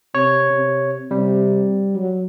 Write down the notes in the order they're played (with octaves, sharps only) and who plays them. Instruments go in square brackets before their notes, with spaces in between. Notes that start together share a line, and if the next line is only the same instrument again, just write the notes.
[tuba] C3 [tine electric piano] C#5
[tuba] C3
[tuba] C3 [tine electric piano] G3
[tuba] F#3